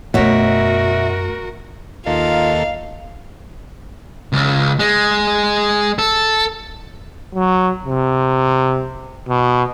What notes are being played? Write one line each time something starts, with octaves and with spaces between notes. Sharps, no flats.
F#2 B2 A3 F#4 A#4 C#5 E5
D#2 A#3 D#4 F4 A4 F5
C#2
G#3
A4
F#3
C3
B2